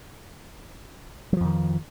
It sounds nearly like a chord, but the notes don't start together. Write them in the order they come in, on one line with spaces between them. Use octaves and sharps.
F#3 F3 F2 D#3